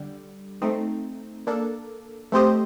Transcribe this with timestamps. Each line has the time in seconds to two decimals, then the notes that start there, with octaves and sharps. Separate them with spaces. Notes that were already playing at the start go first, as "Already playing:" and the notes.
Already playing: D3 G3
0.62 A3 C4 D#4
1.47 A#3 D4 A4
2.32 A3 C4 G4 C5 D#5